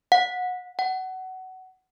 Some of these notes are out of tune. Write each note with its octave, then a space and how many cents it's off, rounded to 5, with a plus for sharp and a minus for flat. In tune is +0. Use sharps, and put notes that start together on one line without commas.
F#5 -30
F#5 +20